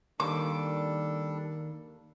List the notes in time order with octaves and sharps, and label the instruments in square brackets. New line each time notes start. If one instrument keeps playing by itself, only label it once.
[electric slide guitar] D#3 A#3 [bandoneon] G3 D4 A4 [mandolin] D6